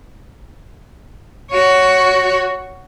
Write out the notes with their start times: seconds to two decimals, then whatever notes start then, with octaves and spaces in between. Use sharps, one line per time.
1.51 F#4 C#5